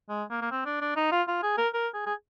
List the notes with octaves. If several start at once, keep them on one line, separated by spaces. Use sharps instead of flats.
G#3
A#3
A#3
C4
D4
D4
D#4
F4
F4
G#4
A#4
A#4
G#4
G#4